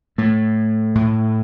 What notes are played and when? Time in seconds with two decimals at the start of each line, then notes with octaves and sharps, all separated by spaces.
0.18 A2 A3
0.95 A2